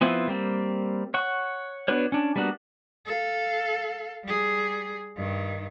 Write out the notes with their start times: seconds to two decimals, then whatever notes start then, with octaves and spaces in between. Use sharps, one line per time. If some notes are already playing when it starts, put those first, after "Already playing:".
0.01 F3 B3 C4 E4 F4
0.28 G3 A#3 C4
1.14 C#5 F#5 C#6
1.88 B3 D4 F#4 B4 C#5
2.12 C#4 D4
2.36 G3 A#3 B3 D4 F#4
3.06 A4 F5
4.24 G3 G#4
5.16 G2 D#3